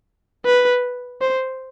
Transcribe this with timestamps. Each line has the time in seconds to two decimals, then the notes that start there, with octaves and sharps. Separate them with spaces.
0.45 B4
1.21 C5